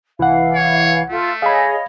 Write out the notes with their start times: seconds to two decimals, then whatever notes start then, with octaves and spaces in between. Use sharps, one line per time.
0.19 C2 E3 F5 F#5
0.55 C#5
1.10 A3 F4 A4
1.42 G#4 C#5 D#5 F5 B5